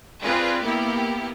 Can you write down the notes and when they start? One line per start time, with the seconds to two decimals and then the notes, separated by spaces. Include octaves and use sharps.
0.22 C4 F4 G#4 B4 D5
0.62 A#3 B3 E4 G4